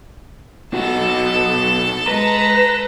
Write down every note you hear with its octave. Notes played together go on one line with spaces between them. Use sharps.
B1 B3 F#4 A4 A5
G#3 B4 A#5